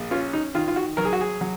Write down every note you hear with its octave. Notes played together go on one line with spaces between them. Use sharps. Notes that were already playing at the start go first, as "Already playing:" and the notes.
Already playing: A#1
C#4 F4
D#4
D#3 F4
F4
F#4
F#3 A#4
G#4
F#4
G#4
F#3